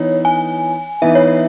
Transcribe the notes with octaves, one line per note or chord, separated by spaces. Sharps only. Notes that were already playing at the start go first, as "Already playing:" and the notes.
Already playing: E3 B3 D#4 C#5
G#5
E3 B3 D#4 E5
C#5